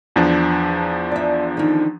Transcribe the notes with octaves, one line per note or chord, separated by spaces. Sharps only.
E2 F3 D4
D5 E5
D3 D#3